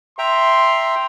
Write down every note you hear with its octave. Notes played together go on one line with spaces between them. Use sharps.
E5 G5 A#5 C6